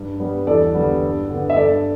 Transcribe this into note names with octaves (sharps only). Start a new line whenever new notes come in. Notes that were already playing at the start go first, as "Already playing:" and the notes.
Already playing: G2
G3 B3
E2 A4 D5
D3 G3 B3
G2
D3 B3
E5
G2 A4 D5